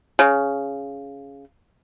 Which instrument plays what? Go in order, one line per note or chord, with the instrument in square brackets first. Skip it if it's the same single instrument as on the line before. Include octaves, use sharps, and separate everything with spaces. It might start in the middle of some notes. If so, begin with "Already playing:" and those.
[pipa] C#3